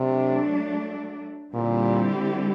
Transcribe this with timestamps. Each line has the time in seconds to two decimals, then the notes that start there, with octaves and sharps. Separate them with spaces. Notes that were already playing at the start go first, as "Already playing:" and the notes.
Already playing: C3 F#3 A3 D4
1.54 A#2 D3 G3 C4 E4 G4